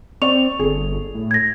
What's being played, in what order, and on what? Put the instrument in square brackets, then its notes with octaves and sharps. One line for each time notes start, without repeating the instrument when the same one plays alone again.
[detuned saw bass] C4 [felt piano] D5 C#6 [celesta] F7
[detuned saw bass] G1 [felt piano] G#4 A4
[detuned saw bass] A2
[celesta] G#6 A#6